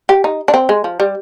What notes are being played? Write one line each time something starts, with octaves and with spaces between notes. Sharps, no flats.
G4
D#4
D4
C4
G#3
F3
G3